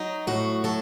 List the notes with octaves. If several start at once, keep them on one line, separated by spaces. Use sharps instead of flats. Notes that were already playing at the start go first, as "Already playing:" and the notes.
Already playing: F#3 D#4
A2 F#4
F#3 A4